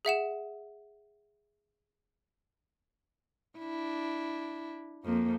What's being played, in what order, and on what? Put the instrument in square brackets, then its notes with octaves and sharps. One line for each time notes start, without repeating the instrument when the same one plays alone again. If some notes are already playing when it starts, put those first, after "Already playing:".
[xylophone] G#4 E5 F#5 E7
[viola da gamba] D4 E4
[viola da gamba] F2 [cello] A#3